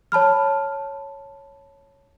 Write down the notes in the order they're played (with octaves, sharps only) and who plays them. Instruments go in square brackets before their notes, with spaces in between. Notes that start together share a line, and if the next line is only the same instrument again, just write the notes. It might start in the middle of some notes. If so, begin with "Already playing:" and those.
[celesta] C#5 A5 B5 F6